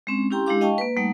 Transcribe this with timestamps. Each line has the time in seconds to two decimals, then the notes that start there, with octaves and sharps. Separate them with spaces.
0.07 G#3 C4 C#4
0.31 C#4 E4 G4 G5 A#5 C6
0.46 G#3 D4 E4 G4 F5 D6
0.61 D#5 F5 G5 A5 C#6
0.78 A#3 B4
0.97 G3 A3 A#3 D#4 F#5